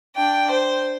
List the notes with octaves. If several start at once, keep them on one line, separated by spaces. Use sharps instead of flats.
D4 G5
C5